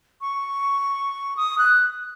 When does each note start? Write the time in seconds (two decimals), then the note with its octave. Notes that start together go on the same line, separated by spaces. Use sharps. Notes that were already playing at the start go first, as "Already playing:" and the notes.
0.21 C#6
1.37 D#6
1.58 F#6